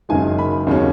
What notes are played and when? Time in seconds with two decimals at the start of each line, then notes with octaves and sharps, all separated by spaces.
0.09 F#1 F#2 D#3 G#3 G#5
0.38 B5
0.67 D#2 C#3 F#3 C#4